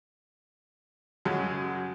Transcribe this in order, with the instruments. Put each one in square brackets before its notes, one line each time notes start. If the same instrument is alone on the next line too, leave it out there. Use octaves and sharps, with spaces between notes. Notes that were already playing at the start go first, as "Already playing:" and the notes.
[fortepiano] F#2 C#3 F#3 G#3